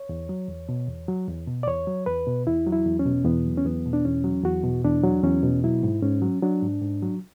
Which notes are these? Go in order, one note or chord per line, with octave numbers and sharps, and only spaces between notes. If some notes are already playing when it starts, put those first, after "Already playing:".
Already playing: C#5
E2
F#3
E2
B2
E2
F#3
E2
B2
D5
E2 C#5
F#3
E2 B4
B2
E2 E4
F#3
E4
E2
C#4
B2
E2 B3
F#3
C#4
E2 B3
B2
D4
E2 C#4
F#3
E2 F#4
B2
E2 D4
F#3
E2 C#4
B2
F#3 E4
G#2
G#2 C#4
F#3
F#3 D4
G#2
G#2
F#3